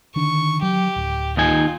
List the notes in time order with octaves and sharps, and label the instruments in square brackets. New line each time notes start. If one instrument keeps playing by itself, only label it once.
[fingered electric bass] D3 D#3 D4 [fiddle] C#6
[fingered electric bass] F#3 [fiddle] G4
[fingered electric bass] D1
[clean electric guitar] D#2 D#4 G#5 [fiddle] F4